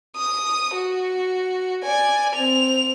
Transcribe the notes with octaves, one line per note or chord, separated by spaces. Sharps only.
D#6
F#4
D5 G#5
C4 F7